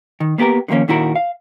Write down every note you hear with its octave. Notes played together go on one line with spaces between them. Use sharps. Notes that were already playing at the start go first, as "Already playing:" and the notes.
D#3
A#3 B3 G4 A4 A#4
D3 D#3 F3 A#3 C#4
A#2 D#3 E4 F#4 A#4
F5